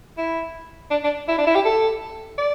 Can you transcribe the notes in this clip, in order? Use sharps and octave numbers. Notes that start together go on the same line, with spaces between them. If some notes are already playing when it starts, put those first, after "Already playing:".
E4
D4
D4
E4
D4
E4
G4
A4
D5